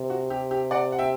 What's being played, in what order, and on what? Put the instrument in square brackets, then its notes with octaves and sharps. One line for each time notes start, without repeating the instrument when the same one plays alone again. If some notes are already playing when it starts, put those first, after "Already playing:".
Already playing: [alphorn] C3
[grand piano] F#4
G4
G4
D5 F#5
F#5
E5 G5